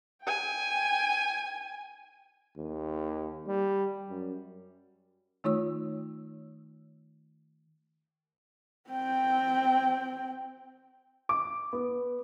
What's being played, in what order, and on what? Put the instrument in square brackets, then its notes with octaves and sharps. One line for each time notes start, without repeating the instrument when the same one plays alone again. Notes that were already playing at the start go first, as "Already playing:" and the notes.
[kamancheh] G5 G#5
[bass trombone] D#2
G3
F#2
[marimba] D#3 A3 D#4 F4 C#5 E6
[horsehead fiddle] C4 G5
[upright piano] D6
B3